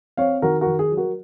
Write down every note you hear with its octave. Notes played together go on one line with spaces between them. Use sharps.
C4 C#5 F5
D#3 F#4 A#4
F#4 A#4
D#3
G#4
F#3
F#4 A#4